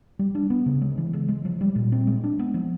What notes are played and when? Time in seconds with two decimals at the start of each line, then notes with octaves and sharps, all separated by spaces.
0.19 G3
0.35 D4
0.50 B3
0.66 C#3
0.81 G#3
0.98 E3
1.13 C#3
1.29 G#3
1.45 F3
1.61 G3
1.76 A#2
1.92 C4
2.07 G#3
2.24 D4
2.39 B3
2.54 F3